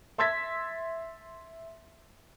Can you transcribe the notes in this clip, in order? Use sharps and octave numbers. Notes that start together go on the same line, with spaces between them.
E5 C6 E6 G#6 A6 B6